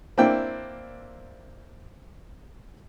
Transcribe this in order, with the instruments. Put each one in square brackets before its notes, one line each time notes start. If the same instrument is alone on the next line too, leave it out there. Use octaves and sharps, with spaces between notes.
[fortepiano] A#3 C4 D4 E4 G5